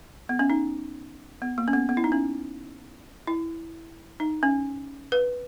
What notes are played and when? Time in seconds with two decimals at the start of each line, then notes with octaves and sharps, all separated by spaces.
0.29 B3
0.39 C#4
0.50 D#4
1.42 B3
1.58 A#3
1.68 C#4
1.73 B3
1.89 B3
1.97 E4
2.04 D#4
2.12 C#4
3.27 E4
4.20 D#4
4.43 C#4
5.12 B4